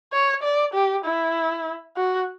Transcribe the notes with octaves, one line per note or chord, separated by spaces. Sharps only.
C#5
D5
G4
E4
F#4